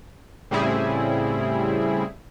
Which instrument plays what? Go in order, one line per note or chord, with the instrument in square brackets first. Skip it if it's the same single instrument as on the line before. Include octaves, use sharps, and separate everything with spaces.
[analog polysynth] A2 C#3 G3 C4 E4 G#4